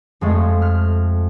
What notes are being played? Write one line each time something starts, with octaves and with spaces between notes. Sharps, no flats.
F2 G#3 A3
F6